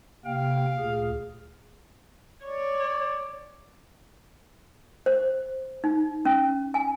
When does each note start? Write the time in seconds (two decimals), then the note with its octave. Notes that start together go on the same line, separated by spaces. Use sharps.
0.25 C3 A#3 F5 G5
0.78 D2 A#2 G#4
2.44 C#5 D5
5.06 C5
5.84 D#4
6.25 C#4
6.74 G#5